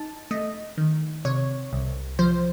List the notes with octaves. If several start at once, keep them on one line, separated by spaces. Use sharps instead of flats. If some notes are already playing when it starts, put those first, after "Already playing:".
Already playing: D#4 A5
A3 D#5
D#3
C3 C#5
C2
F3 C5